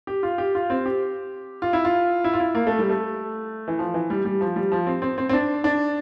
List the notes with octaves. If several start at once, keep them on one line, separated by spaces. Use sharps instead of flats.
G4
F4
G4
F4
C4
G4
F4
E4
F4
E4
F4
E4
A#3
A3
G3
A3
E3
F3
E3
G3
G3
F3
G3
F3
C4
C4
C4
C4
D4
D4